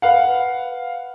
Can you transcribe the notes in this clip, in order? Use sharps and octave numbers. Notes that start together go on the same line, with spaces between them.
B4 F5 F#5